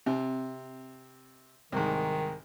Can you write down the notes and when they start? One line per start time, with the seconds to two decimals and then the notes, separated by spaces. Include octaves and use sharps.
0.06 C3 C4
1.72 C2 G#2 D#3